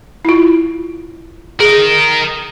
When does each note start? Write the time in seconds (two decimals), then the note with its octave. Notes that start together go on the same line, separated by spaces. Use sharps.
0.25 E4 F4
1.60 G#4 A#4 D#5